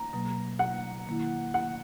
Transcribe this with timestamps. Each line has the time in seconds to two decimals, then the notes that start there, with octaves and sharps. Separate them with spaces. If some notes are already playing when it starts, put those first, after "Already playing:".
Already playing: A#5
0.13 B2 F#3 A#3
0.59 F#5
1.07 D#3 A#3 E4
1.54 F#5